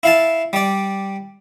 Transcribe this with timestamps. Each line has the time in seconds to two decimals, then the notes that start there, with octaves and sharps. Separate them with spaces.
0.03 E4 F5 A5
0.53 G3 D5